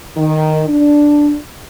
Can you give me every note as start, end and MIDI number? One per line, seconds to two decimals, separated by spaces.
0.17 0.63 51
0.68 1.34 62